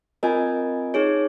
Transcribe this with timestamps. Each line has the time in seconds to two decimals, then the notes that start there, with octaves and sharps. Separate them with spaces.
0.23 C4 F4 A#4 D#5 G#5
0.94 D#4 G#4 C#5